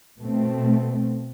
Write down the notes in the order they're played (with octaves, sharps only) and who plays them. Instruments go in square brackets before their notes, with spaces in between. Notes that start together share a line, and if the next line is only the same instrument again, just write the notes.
[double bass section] B2 A3 C4